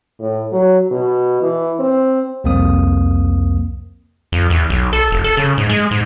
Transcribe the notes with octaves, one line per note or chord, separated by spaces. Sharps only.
A2
F#3
B2
E3
C4
C2 F2 A#3 C4 D#6
F2
E2
B1
A4
F1
A4
C#3
G#2
G#3
G#2